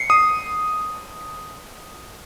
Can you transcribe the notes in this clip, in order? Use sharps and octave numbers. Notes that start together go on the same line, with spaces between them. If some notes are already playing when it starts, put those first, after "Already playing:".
Already playing: C7 C#7
D#6